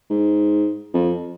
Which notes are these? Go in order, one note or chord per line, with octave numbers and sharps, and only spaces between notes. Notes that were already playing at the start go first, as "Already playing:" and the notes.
G#2
F2